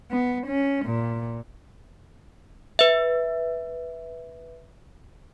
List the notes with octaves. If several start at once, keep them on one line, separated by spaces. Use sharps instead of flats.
B3
C#4
A#2
B4 E5